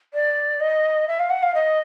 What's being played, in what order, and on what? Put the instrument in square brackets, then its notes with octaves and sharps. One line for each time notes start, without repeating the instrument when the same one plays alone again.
[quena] D5
D#5
E5
F5
F#5
F5
D#5